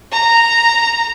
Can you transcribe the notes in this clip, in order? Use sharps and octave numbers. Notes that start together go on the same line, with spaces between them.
A#5